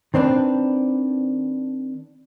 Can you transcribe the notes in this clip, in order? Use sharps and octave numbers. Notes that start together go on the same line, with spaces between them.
D#3 C4 D4 B4